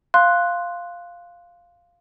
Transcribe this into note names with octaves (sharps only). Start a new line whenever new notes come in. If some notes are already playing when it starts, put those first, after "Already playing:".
F5 C6 F#6